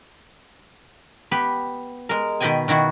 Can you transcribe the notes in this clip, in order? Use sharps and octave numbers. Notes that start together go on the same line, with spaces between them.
B3 G4 B4
G#3 A#4
B2 D#3 B4 D#5 G5 G#5
B2 D#3 E4 F#4